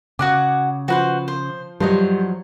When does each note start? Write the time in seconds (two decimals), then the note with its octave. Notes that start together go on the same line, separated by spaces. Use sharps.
0.19 C#3 F#4 F#5 G#5 D6
0.88 F3 F#4 B4 C5
1.28 C5
1.80 G2 F3 F#3 C5 D#5